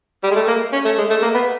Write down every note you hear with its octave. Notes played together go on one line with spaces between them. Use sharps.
G3
G#3
A3
A#3
C#4
A3
G#3
A3
A#3
B3